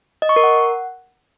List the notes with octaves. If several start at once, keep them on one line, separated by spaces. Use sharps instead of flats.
D#5
C#6
A#4
F#5